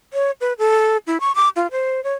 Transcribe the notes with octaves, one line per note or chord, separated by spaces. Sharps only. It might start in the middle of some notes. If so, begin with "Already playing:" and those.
C#5
B4
A4
E4
C#6
D6
F4
C5
C#5